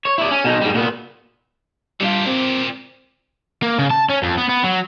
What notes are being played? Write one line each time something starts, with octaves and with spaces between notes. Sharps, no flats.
C#5
E4 D5
C#4
B2 D#4
G#2 G3
A#2 B3
A#2 G3 D4 F4 G4
C4
A#3
C#3
A5
C#4
F2
B3
B3
F#3